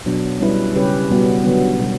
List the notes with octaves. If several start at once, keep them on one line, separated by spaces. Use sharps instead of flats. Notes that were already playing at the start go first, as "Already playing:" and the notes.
B2 F#3 B3 D4
G3 C#4 E4 B4
C#3 G3 C#4 G4 B4
B2 G3 B3 F#4
D3 F#3 B3
B2 G3